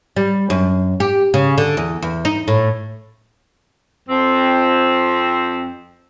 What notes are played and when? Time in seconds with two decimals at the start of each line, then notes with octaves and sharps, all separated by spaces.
0.16 G3
0.50 F#2
1.00 G4
1.34 C#3
1.58 D3
1.77 E2
2.02 E2
2.25 D#4
2.48 A2
4.08 F2 C4